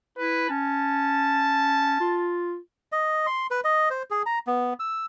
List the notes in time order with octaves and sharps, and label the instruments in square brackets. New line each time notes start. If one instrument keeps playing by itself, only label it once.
[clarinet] E4 [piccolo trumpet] B4
[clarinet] C#4 [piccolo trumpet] A5
[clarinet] F4
[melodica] D#5
C6
B4
D#5
C5
G#4
A#5
B3
E6